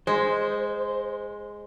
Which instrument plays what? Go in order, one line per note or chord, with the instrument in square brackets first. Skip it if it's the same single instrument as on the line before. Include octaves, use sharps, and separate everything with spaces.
[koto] G#3 [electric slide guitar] C5